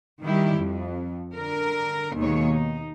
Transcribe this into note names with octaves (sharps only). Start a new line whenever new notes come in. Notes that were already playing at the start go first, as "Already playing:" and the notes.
D#3 G3 E4 G4
F2
D3 A#4
D#2 B2 D#3 G#3 C#5
D#4